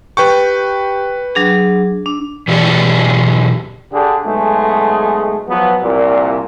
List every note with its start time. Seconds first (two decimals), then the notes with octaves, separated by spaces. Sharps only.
0.17 G4 B4 G5 C#6
1.35 F#3 D4 G#4
2.06 D4
2.48 B2 E3 F#3 G4 G#4 D5
3.92 D3 D4 G4 G#4
4.24 B1 G#3 A3 G#4
5.48 F3 F#3 B3
5.82 C2 A#2